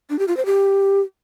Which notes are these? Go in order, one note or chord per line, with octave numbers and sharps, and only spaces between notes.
D4
G4
F4
C5
G4